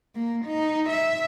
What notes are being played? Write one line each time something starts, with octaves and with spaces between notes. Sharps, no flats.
A#3
D#4
E5